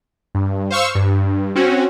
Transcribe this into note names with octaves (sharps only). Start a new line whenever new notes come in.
G2
C5 F5 C#6 E6
G2
C4 C#4 F#4